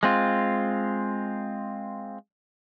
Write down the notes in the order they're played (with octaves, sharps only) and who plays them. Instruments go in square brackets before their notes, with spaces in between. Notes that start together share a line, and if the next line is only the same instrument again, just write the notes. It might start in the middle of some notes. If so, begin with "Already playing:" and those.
[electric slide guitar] G#3 C4 F4